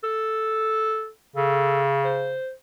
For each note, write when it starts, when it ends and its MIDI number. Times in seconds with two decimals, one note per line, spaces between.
0.04 1.08 69
1.36 2.38 49
1.36 1.82 69
2.04 2.51 72